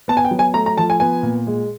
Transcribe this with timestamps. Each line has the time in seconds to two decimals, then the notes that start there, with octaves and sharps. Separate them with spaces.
0.08 B3 A5
0.17 G#5
0.25 G5
0.31 F#3
0.39 G#5
0.54 A3 A#5
0.66 A#5
0.78 F3 A5
0.90 G#5
1.00 B3 G#5
1.23 A#2
1.47 G#3